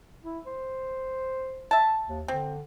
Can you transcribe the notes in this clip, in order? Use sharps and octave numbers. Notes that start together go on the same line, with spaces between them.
E4
C5
E5 A5
D#2
D3 C4